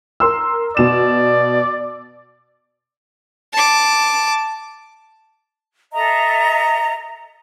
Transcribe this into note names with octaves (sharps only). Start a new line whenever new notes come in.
A#4 C6 E6
B2 D5 E7
A5 D6
A4 D#5 E5 A#5